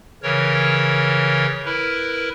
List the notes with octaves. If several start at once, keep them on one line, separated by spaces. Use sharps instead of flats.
C#3 E3 A#4 C#5
E4 A#4 B4